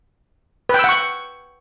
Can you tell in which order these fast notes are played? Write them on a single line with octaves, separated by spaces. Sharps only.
B4 G5 E6 F#5 C#6